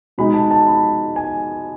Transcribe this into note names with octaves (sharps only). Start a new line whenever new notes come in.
B2 G#3 D#4 B5
A5
A5
B5
G#5